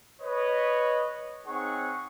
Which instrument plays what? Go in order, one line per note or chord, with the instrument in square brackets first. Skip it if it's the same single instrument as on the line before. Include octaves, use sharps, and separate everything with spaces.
[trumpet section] B4 C#5 D#5
C4 D#4 G#4 C#5 F#5 C#6